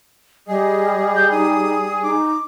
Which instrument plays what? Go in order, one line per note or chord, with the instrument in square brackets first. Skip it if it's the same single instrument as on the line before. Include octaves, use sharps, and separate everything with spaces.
[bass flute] G3 [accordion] G#4 [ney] D#5
[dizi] G6
[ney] D#4 [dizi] D#6
[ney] D#4 [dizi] D6